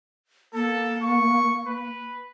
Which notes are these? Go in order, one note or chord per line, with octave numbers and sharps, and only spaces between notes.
A#3 A4
C#6
B4